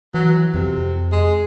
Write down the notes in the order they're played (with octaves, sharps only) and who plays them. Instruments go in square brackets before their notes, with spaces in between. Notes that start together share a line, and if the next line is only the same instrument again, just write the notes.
[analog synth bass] E3 [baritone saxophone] F#3
[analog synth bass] F2 [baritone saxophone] C3
[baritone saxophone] G#3